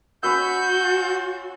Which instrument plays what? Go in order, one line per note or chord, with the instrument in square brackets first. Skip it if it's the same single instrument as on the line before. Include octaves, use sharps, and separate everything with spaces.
[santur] C#4 B4 E6 [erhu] F#4 [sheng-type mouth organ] G6